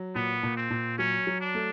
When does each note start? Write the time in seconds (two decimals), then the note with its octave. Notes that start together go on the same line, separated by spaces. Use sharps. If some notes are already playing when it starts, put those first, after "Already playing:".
Already playing: F#3
0.15 A#2 B3
0.43 A#2
0.57 C4
0.70 A#2
0.98 F#3 C#4
1.27 F#3
1.41 D4
1.55 A3